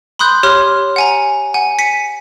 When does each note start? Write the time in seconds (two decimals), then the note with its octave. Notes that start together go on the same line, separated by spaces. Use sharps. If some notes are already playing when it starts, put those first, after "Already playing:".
0.19 B5 C6 D#6 F#6 G6
0.43 G4 C#5 C6 F6
0.96 F#5 G#5 A#5
1.54 F#5 G#5
1.79 B6 C#7 D#7